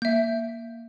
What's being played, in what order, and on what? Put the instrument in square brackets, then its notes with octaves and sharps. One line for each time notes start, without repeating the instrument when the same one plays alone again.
[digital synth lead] A#3 [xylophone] E5 G6